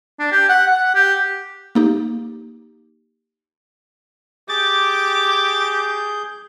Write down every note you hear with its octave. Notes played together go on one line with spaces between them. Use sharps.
D4
G4
F#5
F#5
G4
A#3 D#4 G4
G4 G#4 D6 G6 A6